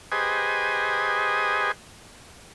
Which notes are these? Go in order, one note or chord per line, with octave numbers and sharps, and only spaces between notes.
G4 G#4 B4 C5 D#5 G#5